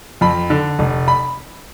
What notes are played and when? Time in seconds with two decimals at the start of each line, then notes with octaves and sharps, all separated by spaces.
0.21 F2 B5
0.50 D3
0.79 F1
1.08 B5